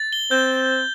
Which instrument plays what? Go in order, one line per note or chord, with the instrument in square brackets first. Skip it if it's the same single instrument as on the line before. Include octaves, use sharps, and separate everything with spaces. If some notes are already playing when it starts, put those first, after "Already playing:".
Already playing: [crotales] A6
G7
[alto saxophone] C4 [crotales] G6